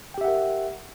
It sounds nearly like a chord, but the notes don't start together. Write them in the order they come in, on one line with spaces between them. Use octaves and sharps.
G5 G4 E5 F#5 A#4